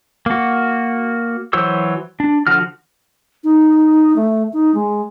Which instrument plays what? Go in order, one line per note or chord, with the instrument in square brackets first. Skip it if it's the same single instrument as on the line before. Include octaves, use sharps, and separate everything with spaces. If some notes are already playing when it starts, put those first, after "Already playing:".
[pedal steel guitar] A#3 F#4
E3 F#3 C5 C#5 E6
D4
D3 F3 F#4 F6
[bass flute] D#4
A3
D#4
G#3